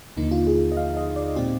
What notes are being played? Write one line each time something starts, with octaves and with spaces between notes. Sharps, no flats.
D#2 D3 F3 A#3 D#4
F4
G#4
D#5
F5
D#5
D5
A#2 G#3 C4 G4